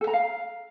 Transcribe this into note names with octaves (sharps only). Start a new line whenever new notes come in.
A4
A#5
F5